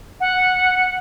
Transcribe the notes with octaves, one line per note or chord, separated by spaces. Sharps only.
F#5